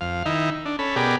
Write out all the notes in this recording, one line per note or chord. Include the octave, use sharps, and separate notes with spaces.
F2 F5
D#3 D#4 E4
D4
C#4 A4 B5
B2 G4 G#4 A#4 D5 B5